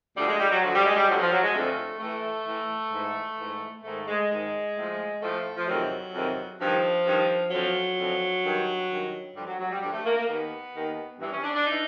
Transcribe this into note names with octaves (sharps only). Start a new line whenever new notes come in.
D2 D3 F3 G3
G#3
G3
F#3
D2 D3 F3 F#3
G3
G#3
G3
F2 D3 F3 F#3
F3
F#3
G#3
F2 D3 F3 A3
A2 E3 A3
A2 E3
G#2 E3
G#2 E3
G#2 D#3 A3
G#3
G#2 D#3 G#3
A2 F3
A2 F3 A3
F3
F2 C3 D#3 F#3
F2 C3 D#3
G2 D#3 F3
G2 D#3
F2 D3 F3 F#3
F2 D3 F3
G2 D#3
G2 D#3
G2 D3 F3 G3
F#3
F#3
G3
G2 D3 F3 G3
A3
A#3
A#3
D#2 D#3 B3
D#2 D#3
G2 E3
C#4
D4
D4
E3 D#4